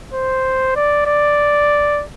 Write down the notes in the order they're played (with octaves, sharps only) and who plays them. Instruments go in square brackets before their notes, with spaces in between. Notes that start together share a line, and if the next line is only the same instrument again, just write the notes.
[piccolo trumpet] C5
D5
D5